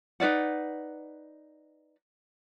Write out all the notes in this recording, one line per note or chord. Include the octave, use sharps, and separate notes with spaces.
D#4 B4 D5 F#5